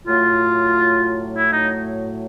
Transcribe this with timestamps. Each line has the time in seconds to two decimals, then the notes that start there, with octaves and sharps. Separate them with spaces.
0.06 A2 F#3 A3 F4
1.37 E4
1.53 D#4